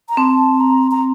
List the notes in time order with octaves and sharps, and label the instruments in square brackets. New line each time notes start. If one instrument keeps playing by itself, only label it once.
[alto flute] A#5
[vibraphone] C4 [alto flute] A5
[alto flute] A#5
A#5